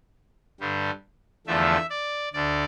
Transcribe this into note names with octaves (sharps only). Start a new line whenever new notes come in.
G2 D3 G3
E2 D3 F3 A3 E5
D5
D2 D3 D5